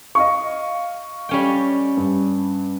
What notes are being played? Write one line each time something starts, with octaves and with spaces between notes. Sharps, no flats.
D#5 F5 C#6
G3 C#4 G5
G2